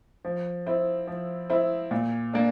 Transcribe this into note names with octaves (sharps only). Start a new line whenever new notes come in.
F3
C4 E4
F3
C4 E4
A#2
A#3 D4